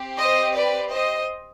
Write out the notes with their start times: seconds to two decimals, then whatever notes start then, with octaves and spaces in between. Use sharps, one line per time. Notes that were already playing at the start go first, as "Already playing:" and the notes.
Already playing: C4 G4
0.18 C5 D#5
0.55 B4 D5
0.93 C5 D#5